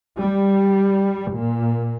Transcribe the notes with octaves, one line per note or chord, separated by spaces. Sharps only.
G3
A#2